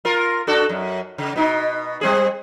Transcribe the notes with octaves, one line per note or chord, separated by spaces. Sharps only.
F4 A#4
D4 F#4 A4
F#2
C#3
B2 D#4
G3 C4 G#4